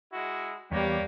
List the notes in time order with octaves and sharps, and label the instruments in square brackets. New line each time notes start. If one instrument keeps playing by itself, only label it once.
[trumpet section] G#3 E4 F#4
[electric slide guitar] E2 B3 [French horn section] G3 [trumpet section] A#3 G4 C#5